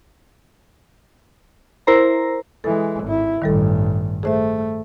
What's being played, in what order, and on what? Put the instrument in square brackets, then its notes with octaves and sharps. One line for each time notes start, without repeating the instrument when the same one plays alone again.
[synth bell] E4 A#4 C5 A#5
[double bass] E3 G#3 [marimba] A4
[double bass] G#1 E4
[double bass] A1 G2 [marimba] D#3 G3 A4
[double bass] A3 [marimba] G#4 C5 E5